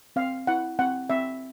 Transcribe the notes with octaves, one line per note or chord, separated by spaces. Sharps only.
C4 F5
E4 F#5
C4 F#5
C4 E5